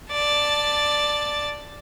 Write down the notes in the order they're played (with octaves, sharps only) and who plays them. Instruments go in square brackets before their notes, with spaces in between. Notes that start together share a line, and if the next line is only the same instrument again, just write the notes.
[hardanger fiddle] D5 A5